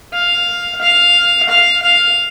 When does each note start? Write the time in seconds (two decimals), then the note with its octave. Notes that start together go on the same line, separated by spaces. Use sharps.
0.13 F5
0.81 F5
1.49 F5
1.82 F5